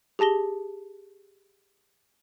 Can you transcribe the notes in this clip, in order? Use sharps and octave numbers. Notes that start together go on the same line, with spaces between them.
G4 G#4 A5 A#6 G7